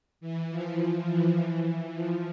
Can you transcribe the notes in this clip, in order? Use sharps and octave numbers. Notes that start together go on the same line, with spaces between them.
E3
F3
F3
E3
F3